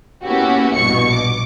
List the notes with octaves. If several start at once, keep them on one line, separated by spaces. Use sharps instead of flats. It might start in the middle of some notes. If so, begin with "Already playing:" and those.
A#3 B3 C#4 E4 F#4 G4
A#1 G2 B2 C#6 C#7
D6